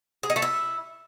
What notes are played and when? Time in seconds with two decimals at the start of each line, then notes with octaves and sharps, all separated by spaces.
0.23 G#4
0.30 D#4
0.36 A3
0.42 E4